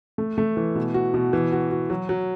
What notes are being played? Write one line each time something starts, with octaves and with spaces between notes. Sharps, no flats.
A3
A3
E3
B2
F#4
B2
E3
F#4
F#4
F#3
F#3